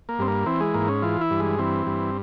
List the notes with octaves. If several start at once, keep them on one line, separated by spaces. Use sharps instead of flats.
A#3
G2 C4
A#3
E3 C4
G#3
G#2 A#3
C#4
E3 F4
E4
G2
G#3
E3 C4
G2